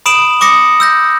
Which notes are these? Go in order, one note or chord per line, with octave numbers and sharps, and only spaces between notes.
B5 D#6 D7 E7 F#7
D6 D#6 A#6 C#7
E6 G6 A#6